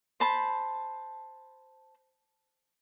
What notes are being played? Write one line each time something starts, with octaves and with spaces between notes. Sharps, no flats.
C5 A5 B5